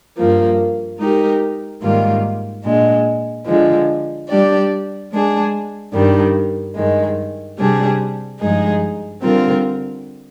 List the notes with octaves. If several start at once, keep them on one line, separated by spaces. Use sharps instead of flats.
G2 F3 A#3
G#3 D#4 G4 A#4
G#2 D#3 G3 A#3 F4
A#2 G#3 D4
D3 F3 G#3
G3 D4 G4 D5
G#3 D4 G#4
G2 D#3 G3 D4
G2 D#3 G#3
C3 G3 D4 G#4
G2 F3 G#3 D#4 G#4
D3 G3 C4 F4 A#4